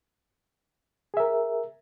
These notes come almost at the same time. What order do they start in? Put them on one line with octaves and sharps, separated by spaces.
G#4 E5 A#4